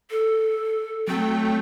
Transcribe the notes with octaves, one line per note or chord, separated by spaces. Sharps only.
A4
F#3 A3 C4 G5